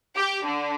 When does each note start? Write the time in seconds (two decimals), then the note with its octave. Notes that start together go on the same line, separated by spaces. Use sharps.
0.16 G4
0.46 D3